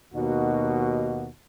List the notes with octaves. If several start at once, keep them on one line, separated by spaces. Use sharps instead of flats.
D#2 B2 A#3 D#4 F#4